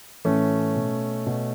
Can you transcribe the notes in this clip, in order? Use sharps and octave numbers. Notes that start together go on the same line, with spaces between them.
A2 E3 A3 C#4
B2
B2